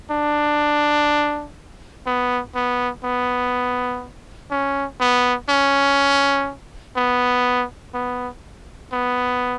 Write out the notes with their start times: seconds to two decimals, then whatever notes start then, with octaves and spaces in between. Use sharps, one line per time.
0.10 D4
2.06 B3
2.55 B3
3.04 B3
4.51 C#4
5.00 B3
5.49 C#4
6.96 B3
7.94 B3
8.92 B3